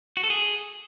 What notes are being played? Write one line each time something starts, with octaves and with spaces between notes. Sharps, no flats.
F#4
A4
G#4